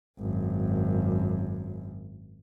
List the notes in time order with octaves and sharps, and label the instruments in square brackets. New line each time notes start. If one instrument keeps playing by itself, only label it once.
[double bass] G#1 F#2